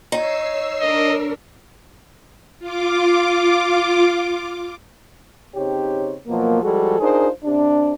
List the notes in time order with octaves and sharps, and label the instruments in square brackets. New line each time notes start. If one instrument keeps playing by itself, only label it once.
[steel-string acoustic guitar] D#4 [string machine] C#5 E6 C7
[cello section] D4 A#4 [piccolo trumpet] D#5
[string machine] F4 D6
[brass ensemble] C#3 C4 D#4 G4 C#5
B2 F3 F#3 A#3
F3 G3 G#3 F#4 G#4 A4
D4 D#4 F4 G#4 A#4 C5
C3 D4